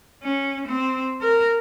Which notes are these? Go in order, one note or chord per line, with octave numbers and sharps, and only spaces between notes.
C#4
C4
A#4